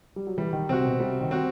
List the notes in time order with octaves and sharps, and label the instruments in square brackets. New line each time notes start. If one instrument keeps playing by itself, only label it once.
[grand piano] G3
F#3
[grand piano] E3 [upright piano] G3
[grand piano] D#3
[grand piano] C3 [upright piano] C4 F#4
[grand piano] B2
[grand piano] C3 [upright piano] G3
[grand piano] D#3
[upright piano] C4 F#4